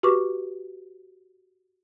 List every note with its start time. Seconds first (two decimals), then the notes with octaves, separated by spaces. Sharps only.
0.03 F#4 G4 B4 C#6 D6